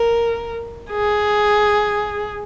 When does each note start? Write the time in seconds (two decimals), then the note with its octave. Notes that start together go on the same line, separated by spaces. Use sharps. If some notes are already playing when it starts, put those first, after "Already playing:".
Already playing: A#4
0.91 G#4